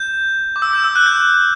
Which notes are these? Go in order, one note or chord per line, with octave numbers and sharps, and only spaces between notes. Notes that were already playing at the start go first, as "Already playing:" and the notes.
Already playing: G6
D6
E6
G6
E6
F#6
G6